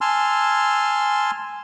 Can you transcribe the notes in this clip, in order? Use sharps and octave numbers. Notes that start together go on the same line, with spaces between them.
G#5 A5 C6 E6 F6